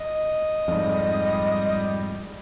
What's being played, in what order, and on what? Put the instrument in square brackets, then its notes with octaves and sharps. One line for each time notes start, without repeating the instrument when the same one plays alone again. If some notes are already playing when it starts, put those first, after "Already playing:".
[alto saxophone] D#5
[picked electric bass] F2 G#2 [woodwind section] G3